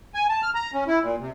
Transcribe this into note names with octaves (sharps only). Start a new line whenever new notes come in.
G#5
A5
F6
A#5
C#4
E4
A#2
C3